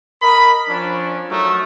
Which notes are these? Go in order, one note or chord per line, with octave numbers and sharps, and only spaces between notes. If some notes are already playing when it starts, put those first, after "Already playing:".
A#4 D#5 B5
F3 C#4 D4
F#3 A3 D#4 A#4